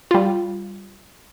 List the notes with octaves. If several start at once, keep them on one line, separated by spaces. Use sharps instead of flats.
G3 F4